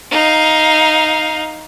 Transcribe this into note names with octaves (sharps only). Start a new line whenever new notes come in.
D#4 F5